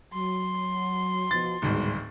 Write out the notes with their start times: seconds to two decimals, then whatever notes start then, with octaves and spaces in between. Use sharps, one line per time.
0.13 F#3 C6
1.31 B2 F3 A6
1.62 D1 G#1 B2 G3 G#3